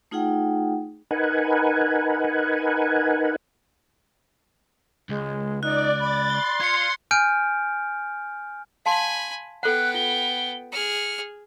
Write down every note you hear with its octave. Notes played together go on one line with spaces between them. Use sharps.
A3 D#4 F4 G#4 F#5 G5
D#4 A#4 B4 F#5 G#5
C#2 G#3
D#4 D5 F#6
B5 A6
C6 G7
F4 G#6 C#7
G#5 F6 G6 D7
F5 G#5 A5 B5 C6
B3 A4 F#5 G5 F#6
F4 G7
G#4 F6 C#7